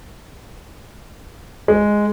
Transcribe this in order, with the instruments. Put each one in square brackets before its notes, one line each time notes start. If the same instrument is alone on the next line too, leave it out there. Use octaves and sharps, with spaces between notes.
[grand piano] G#3